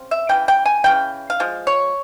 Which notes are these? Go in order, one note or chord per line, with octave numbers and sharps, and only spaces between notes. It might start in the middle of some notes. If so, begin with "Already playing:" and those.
Already playing: C#3 C4
E5
C#3 E3 G5
G5
G#5
C#3 E3 G5
F5
F3 G#3
C#5